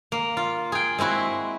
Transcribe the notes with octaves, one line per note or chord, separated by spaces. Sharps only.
A#3
F4
G#4 G5
G#3 C4 E4 F#4